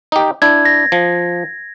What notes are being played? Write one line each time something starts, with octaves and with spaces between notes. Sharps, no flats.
D#4 G4
D4 E4 G#6
A#6
F3